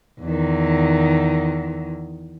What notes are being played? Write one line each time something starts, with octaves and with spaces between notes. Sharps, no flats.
E2 D#3